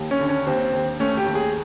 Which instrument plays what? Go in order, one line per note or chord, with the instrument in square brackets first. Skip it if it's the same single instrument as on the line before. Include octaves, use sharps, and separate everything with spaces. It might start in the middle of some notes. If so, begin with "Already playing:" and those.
Already playing: [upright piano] D#2
C#4
D3
C#4
D#2 C4
D#2
A3 C#4
G4
D#2
G#4